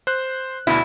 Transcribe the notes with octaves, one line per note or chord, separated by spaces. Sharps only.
C5 F#6
D2 B2 E4